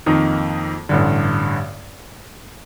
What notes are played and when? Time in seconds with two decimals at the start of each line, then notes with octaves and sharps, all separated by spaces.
0.06 F2 D#3 A#3 D#4
0.89 A1 G2 D3